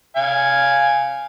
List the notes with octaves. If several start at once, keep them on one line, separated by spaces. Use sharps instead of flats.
F5 G#5